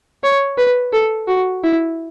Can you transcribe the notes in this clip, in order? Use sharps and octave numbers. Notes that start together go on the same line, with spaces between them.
C#5
B4
A4
F#4
E4